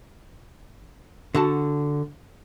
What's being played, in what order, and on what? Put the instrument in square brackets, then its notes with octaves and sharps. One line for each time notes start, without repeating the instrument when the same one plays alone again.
[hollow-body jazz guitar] D3 F#4 A5